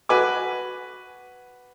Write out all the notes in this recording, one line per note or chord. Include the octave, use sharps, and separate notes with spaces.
F#4 B4 G#5 D6